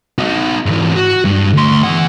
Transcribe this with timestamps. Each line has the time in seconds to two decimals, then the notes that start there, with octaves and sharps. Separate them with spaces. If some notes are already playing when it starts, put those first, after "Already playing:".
0.19 D#4 F#4
0.66 G#2 E3
0.96 F#4
1.25 G2
1.54 D2 C6
1.83 E2 F#5